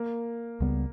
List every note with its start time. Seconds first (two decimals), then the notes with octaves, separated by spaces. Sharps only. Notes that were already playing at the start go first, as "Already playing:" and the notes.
Already playing: A#3
0.60 C#2 C#3 G3 B3